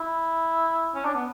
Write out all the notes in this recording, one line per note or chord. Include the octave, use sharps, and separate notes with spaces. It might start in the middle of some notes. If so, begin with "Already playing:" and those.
Already playing: E4
C#4
D4
B3